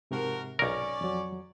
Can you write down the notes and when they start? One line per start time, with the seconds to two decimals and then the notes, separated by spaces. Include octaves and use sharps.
0.11 G#2 C3 F3 F#4 A#4
0.59 B1 C#4 A#4 C#5 D5
1.01 F2 F#3